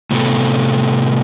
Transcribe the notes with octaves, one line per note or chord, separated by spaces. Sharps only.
A2 C3 B3 A4